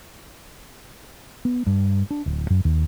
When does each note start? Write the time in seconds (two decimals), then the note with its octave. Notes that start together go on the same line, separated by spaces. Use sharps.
1.45 B3
1.67 G2
2.11 D4
2.26 D1
2.50 F#2
2.65 D#2